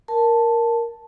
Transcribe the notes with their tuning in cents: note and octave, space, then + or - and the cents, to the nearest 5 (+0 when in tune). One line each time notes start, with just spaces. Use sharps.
A#4 +0 A5 +0